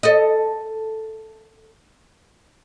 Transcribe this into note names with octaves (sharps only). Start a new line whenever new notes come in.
A4 D#5